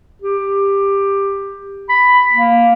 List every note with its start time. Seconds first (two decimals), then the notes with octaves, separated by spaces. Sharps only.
0.22 G4
1.89 B5
2.32 A#3